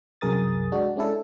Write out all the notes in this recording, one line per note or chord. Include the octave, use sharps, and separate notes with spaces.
C2 F#2 G#4 A#4 D#6 A6
G#3 D4 F#4
G#3 C#4 D4 E4 A4